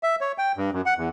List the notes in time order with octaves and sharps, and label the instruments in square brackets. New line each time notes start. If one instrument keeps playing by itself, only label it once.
[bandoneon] E5
C#5
G5
G2
F#2
F#5
E2